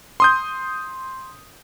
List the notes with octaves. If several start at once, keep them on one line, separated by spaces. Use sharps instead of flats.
C6 D#6 G6